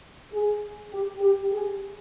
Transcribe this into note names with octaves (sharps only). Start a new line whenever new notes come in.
G#4
G4
G4
G#4